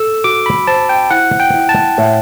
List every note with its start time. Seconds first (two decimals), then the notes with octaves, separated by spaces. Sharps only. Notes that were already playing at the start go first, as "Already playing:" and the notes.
Already playing: A4 E6
0.24 F#4 D6
0.46 B5
0.67 C5 A5
0.89 G5
1.11 E4 F#5
1.40 G5
1.54 E4
1.69 A5
1.98 A2